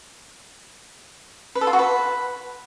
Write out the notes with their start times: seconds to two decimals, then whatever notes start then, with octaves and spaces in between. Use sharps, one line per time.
1.55 B4
1.61 A4
1.67 F4
1.73 F#4
1.79 B4